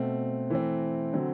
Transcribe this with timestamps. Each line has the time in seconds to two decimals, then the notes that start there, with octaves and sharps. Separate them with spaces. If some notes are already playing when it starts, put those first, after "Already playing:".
Already playing: B2 A3 C4
0.50 E3 A3 C4
1.13 D3 F#3 C4